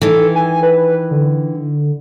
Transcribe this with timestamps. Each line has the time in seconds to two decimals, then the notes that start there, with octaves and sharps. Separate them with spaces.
0.01 D#3 E3 A4
0.35 G#5
0.63 B4
1.11 D3